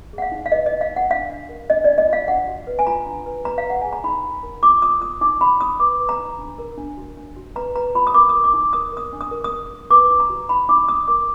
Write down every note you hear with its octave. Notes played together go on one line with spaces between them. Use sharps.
G#4 F#5
F5
D#4
F5
B4 D#5
D#5
D#4
F5
D#4
F#5
D4 F5
D4
A#4
D4 D#5
D4 D5
D#5
F4 F5
D4 F#5
F#4
B4
G#5
F4 A#5
D4
B4
B4 A#5
F5
B4 F#5
G#4 G#5
A#5
D#4 B5
D#4
A#4
F4 D6
F4 D#6
F4 D#6
D#4 D6
D#4 B5
D#4 D#6
B4 D6
B4
A#5
D#4
D4
A#4
D4
F#4
D4
F#4
B4 A#5
B4 A#5
F4 B5
D#6
A#4 D6
A#4 D#6
D6
D#4
A#4 D#6
A#4 D#6
D4
D#6
A#4
D#6
A#4
A#4
B4 D6
D#4
A#5
F#4
D#4 B5
D#4 D6
D#4 D#6
A#4 D6